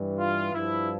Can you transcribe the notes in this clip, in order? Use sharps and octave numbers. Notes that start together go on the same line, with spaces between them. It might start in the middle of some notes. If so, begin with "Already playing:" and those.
Already playing: G2 E3
F4
G2 F3 E4